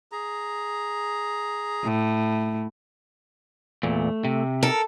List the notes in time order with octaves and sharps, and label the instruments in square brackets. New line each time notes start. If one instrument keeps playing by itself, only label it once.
[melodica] G#4 A#5
[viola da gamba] A2
[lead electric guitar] E2 A#2 [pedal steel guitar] A3
[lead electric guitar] C3
[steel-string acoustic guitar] A4 [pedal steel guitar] A#4